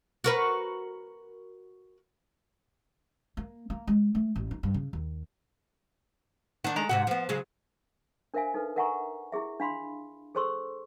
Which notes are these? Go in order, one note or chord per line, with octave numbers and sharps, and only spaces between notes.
F#4 A#4 B4
A#3
A#3
G#3
A3
A1
D#4
G2
C#3
D#2
D#3 D4 F#5
G#3 A4 A#5
G#2 C3 F#4 F#5
F3 B3
C#3 F#3 G#3
D4 A#4 C5 E5 F5 G#5
D#4 A4 B4
A#4 E5 F#5 G#5 A#5 C#6
E4 G4 G#4 E5
D4 F5 B5 C6
G#4 A4 C5 C6 C#6 E6